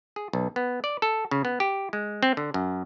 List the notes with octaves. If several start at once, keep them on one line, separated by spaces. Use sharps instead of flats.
G#4
B1
B3
D5
A4
C#3
B3
G4
G#3
C4
D3
F#2